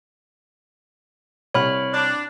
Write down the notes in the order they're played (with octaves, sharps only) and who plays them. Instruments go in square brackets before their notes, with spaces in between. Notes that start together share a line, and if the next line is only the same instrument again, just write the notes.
[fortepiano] C2 [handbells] C#5 B5 F6
[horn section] D4